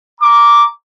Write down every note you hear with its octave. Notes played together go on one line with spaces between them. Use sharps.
A#5 D6